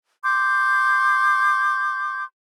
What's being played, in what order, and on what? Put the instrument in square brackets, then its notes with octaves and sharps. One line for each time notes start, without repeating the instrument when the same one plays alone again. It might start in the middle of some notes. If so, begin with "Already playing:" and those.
[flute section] C6 D6 G6